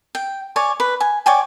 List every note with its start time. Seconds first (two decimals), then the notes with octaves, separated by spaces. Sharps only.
0.15 G5
0.56 C#5 D5 G#5
0.80 B4
1.00 G#5
1.26 C#5 D5 G5 G#5